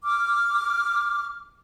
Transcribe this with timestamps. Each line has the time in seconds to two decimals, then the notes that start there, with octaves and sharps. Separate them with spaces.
0.04 D6 F6